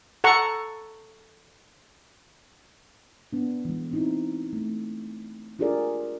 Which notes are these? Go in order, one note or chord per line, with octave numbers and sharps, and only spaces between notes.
A4 F#5 A#5 C#6
B3 D4
E3 G#3
C4 D#4 E4
A3
D4 F4 G4 G#4 A#4 D5